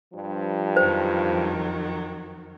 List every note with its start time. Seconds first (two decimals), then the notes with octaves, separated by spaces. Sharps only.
0.14 G2 F3
0.77 F2 D#3 F#3 C5